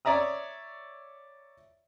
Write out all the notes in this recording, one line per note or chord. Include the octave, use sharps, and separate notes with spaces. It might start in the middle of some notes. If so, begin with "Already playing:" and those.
C#5 D5 E5 A#5 D#6